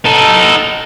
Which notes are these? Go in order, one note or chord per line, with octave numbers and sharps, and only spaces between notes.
D#4 A4